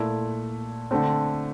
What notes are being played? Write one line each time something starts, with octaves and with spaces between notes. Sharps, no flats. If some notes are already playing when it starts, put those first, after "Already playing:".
Already playing: A#2 A3 E4
D3 A3 C4